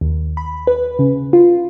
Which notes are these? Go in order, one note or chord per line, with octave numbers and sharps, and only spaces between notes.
D#2
B5
B4
C#3
F4